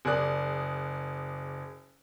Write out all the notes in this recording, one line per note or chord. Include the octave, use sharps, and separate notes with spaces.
F#1 G#4 A#4 D5 F#6